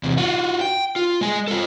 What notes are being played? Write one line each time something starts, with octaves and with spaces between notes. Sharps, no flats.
E2 C3
F4 F#4
G5
F4
G#3 G#5
F4 A4